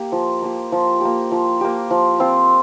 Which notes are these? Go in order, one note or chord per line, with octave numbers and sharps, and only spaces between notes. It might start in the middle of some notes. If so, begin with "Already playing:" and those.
Already playing: A#3 G4
F3
A#3 G4
F3
A#3 G4
F3
A#3 G4
F3
C4 F4